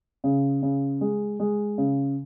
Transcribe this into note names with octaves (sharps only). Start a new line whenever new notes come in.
C#3
C#3
G#3
G#3
C#3